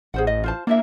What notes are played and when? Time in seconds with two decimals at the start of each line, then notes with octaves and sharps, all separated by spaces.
0.14 A1 G#4 C5 F#5
0.27 D#5
0.44 F4 C5 A5
0.67 A#3 D4 E4 E5